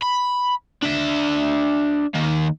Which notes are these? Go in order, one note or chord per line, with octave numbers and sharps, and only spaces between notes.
B5
D4 E5
D#3 A#3